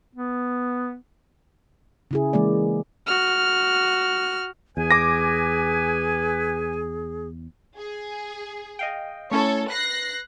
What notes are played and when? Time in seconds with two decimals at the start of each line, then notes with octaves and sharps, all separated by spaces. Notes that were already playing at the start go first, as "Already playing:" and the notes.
0.15 B3
2.11 C#3 E4 G#4
2.33 E3 G#3 A#3 D5
3.07 F#4 F6
4.77 E2 G#4 B4 G#5
4.91 D6 A#6
7.76 G#4
8.79 D#5 F5 G5
9.31 A3 C#4 E4 A4 C#5
9.70 B4 F#6 A#6 C7